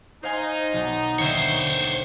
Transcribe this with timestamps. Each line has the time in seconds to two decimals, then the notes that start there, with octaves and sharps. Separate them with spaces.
0.23 D#4 C5 F5 G#5
0.73 B1 A6
1.19 D#2 D3 C5 C#5 E5